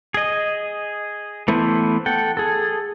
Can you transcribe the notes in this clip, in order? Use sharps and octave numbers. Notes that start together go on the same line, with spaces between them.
G#4 D#5
E3 A3 B3 E4 C5
A4 F#5 G5
G#4 A4